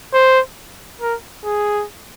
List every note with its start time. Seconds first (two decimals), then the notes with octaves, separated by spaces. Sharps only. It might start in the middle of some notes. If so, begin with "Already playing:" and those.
0.14 C5
1.01 A#4
1.45 G#4